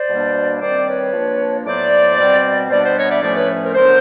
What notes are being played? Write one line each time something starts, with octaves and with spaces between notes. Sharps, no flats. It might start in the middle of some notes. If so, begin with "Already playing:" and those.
Already playing: C5 D5
B2 G3 A#3 D4
D#3 G3 C4 C5 D5
B4 C#5
F3 A#3 D4
A2 F#3 B3 C5 D5
B2 G3 C4
B2 G3 B3 D4 C5 D5
C5 D5
C#5 D#5
D5 E5
A2 F3 A3 C#4 C5 D5
B4 C#5
A#4 C5
D3 F#3 B3 D4 A#4 C5